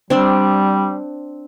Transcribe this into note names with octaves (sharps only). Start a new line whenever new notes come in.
G3 C4 D4 D5